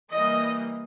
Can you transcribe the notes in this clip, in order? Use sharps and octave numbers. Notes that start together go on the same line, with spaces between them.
E3 G3 A#3 D#5